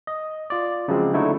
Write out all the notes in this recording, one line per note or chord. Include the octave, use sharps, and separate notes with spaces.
D#5
F4 D5
C#3 F3 F#3 G#3 C4
D3 F#3 A3 D#4 E4